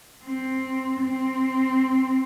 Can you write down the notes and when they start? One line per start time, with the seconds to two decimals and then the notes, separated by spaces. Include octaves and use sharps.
0.25 C4
1.02 C4